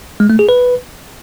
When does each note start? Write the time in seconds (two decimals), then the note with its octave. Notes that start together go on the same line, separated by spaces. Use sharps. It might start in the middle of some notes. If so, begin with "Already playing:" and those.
0.20 G#3
0.30 A3
0.39 G#4
0.49 B4